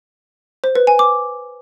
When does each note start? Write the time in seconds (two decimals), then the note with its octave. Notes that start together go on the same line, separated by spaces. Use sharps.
0.64 C5
0.75 B4
0.87 G#5
0.99 D6